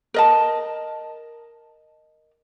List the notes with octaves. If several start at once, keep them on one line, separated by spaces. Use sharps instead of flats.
A#4 D#5 A5